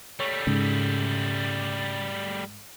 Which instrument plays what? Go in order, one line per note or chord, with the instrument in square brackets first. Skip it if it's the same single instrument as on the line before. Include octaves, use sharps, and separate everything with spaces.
[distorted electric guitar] G3 A3 [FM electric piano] C#5
[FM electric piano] G#2 [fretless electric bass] C#3